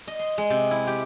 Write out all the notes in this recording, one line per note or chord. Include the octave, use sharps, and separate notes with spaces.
D#5
C6
G#3
C3
E4
G4